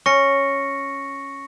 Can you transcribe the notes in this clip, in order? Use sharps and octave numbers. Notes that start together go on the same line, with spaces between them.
C#4 C#6 A#6 C#7